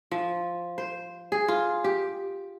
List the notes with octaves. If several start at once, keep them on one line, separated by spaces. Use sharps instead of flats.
F3
C5
G#4
F4
G4